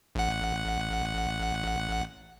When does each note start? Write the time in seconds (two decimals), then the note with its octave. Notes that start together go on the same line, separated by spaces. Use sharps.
0.15 A1 F#5